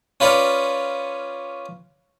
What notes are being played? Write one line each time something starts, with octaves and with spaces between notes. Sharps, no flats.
C#4 F4 B4 C#5 D5